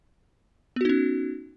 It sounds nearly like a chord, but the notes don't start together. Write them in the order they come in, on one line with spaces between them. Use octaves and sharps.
B3 F#4 D#4 C#4